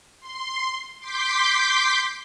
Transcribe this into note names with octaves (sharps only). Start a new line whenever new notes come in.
C6
C6 D6 G6 B6